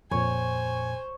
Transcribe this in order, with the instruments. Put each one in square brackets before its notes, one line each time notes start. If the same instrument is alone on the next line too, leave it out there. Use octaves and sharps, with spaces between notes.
[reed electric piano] F2 A#2 [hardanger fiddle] C5 [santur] C#5 [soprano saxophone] G#5